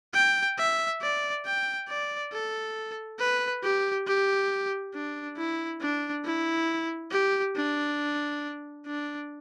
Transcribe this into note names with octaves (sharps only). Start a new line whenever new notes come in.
G5
E5
D5
G5
D5
A4
B4
G4
G4
D4
E4
D4
E4
G4
D4
D4